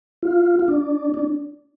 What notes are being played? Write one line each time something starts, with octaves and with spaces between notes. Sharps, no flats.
F4
F4
D4
D4